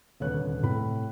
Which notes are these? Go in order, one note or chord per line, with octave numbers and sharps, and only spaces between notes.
D#1 D2 C3 B4 C#5 F#6
A2 C3 B5